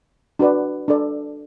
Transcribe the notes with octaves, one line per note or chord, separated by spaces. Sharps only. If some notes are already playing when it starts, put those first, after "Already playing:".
D4 F#4 B4 D5
D4 A4 D5